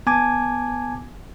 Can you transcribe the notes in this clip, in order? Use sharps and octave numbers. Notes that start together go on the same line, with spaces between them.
B3 G#5 A5 D6 G#6